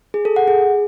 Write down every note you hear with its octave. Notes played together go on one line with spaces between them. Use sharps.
G#4
A4
F#5
G#4